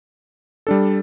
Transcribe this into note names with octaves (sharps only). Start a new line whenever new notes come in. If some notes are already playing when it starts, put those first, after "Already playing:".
G3 D4 A4